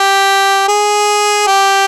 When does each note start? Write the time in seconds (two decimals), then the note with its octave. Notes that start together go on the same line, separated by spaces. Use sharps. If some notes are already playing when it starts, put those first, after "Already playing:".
Already playing: G4
0.68 G#4
1.47 G4